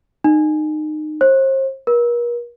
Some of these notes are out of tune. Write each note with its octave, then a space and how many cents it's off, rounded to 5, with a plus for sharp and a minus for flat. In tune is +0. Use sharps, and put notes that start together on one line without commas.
D#4 -25
C5 +40
A#4 +40